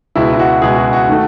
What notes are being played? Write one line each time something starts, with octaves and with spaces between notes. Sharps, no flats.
C#2 B2 G#3 E4
E4
F#4
C#2 B2 G#3 G#4
F#4
F#4
D#3 A3